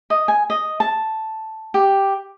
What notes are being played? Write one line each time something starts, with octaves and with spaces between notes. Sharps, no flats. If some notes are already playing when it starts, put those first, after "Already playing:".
D#5
G#5
D#5
A5
G4